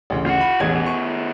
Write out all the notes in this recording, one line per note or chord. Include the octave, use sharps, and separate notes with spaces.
A1 D2 C#3
F4 F#5
B5
E1 A1 D#3 B3 G#6
C#6